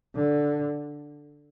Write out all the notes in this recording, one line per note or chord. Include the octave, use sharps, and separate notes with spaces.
D3